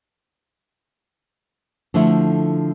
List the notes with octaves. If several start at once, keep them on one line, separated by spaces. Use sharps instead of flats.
D3 F3 A3 E4